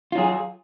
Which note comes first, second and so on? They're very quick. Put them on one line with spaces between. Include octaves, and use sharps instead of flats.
F4 F#3 G#4